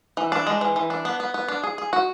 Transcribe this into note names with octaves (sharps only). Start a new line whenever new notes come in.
E3
D4
G#3
E3
E3
D4
B3
B3
B3
D4
G#4
G#4
F#4